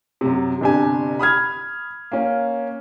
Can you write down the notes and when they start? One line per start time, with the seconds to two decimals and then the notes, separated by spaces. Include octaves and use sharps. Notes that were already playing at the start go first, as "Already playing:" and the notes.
0.21 F#2 C3
0.61 G1 C3 D4 G4 G#5
1.19 B5 D#6 F6 G#6
2.12 A#3 C#4